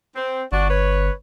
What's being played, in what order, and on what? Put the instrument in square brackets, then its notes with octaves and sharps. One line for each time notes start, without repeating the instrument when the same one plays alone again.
[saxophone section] C4
[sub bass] G1 [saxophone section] D4 F#4
[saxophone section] B4 C#5